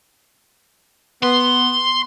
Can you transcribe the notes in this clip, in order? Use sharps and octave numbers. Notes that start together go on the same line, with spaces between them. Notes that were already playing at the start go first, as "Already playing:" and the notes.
B3 C6